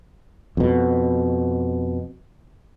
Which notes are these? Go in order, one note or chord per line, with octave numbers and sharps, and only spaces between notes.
F2 B2